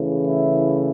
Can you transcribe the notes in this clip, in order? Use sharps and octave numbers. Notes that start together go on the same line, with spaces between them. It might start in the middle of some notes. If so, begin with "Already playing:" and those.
Already playing: C#3 E3 A3
E4